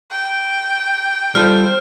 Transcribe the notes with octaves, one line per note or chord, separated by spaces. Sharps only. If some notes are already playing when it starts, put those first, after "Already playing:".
G5
G3 F4 A4 C5 F6